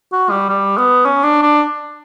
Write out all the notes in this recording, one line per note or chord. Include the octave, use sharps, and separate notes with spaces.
F#4
G3
G3
B3
C#4
D4
D4